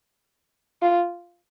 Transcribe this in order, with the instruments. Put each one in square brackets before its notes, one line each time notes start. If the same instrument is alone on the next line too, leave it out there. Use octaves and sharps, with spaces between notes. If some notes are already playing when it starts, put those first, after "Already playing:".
[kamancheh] F4